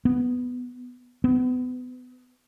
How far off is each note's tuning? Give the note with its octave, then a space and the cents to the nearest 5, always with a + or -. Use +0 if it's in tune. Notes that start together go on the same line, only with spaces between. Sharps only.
B3 +5
B3 +30